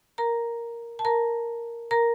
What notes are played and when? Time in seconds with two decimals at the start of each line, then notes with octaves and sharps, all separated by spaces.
0.18 A#4 A#5
0.99 A5
1.05 A#4 A#5
1.91 A#4 A#5